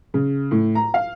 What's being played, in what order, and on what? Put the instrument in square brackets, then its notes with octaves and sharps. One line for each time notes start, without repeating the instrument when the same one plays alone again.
[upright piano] C#3
A2
A#5
F5